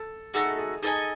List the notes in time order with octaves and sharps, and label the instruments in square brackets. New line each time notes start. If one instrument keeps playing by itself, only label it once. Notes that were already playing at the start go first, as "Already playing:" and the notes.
Already playing: [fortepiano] A4
[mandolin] A3 D#4 F#4 [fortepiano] G#4
[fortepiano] A4
G#4
[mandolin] D#4 A4 D#5 G#5 [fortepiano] G#4